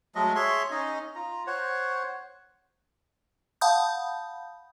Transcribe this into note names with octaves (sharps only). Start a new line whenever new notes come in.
F#3 G#3 A3 D#5
G#4 C#5 E5 C6
C#4 D#4 D#5
F4 A#5
C5 C#5 F#5
F5 F#5 A5 B5 D#6 G6